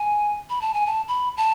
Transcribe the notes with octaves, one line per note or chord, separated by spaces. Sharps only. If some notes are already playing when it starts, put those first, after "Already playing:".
Already playing: G#5
B5
A5
G#5
A5
B5
A5